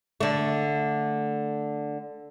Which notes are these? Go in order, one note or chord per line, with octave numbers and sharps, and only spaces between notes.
D3 A3